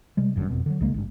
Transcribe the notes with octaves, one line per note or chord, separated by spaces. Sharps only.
C3 G3 G#3
G1 F#2 A#2 D3
F2 B2
D3 D#3 F#3
C2 C#3 G#3 A#3
G#1 G2